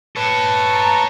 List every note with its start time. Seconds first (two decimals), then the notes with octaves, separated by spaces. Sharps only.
0.16 A4 B4 C#5 A5 C#6
0.74 A#5